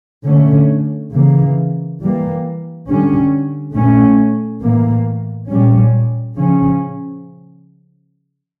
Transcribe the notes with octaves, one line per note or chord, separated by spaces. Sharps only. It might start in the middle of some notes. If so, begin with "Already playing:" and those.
D3 A3 C#4
C#3 E3 A#3
E3 G3 A#3
D3 G3 C#4
A#2 A3 C#4
A2 E3 A#3
A#2 G3 C#4
C#3 F3 C#4